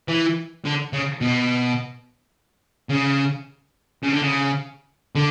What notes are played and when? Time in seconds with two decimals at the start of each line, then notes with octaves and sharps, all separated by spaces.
0.08 E3
0.65 D3
0.93 C#3
1.21 B2
2.90 C#3
4.03 C#3
4.12 D3
4.22 C#3
5.15 D3